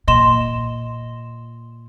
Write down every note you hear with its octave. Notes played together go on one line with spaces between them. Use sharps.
A#2 D#5 C6 E7